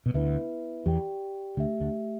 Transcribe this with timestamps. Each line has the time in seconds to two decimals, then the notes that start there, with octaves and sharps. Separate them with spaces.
0.06 B2
0.14 D2 D3 B3 E4 B4 E5
0.86 E2 E3 G4 D5 G5
1.57 D2 D3 A3 G4 E5
1.80 D2 D3